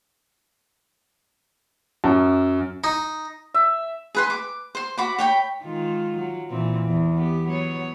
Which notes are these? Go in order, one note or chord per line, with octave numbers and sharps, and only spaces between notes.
F#2
D#4
E5
G#4 B4 C6
D6
C5 C6
F#4 B5 D6
C#5 G5 B5
D#3 G#3 F4
F#3
A#2 E3 C4
E2
B3 G4
F#3 B3 C#5